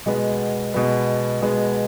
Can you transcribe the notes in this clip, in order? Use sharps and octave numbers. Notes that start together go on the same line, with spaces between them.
B2 G#3 B3
B2 G#3 B3
B2 G#3 B3